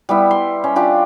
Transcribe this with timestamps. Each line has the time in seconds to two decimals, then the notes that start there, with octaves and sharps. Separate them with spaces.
0.09 G3 B3 E4
0.31 C6
0.64 C#4
0.76 D4 F4 G4